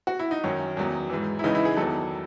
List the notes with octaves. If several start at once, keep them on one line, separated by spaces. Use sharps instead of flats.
F#4
E4
D#4
F#2 D#3 F#3 C#4
E2 D#3 F#3
G#2 E3
E4
C#2 C#3 E3 D#4
E4
G#4
E2 D#3 F#3 A4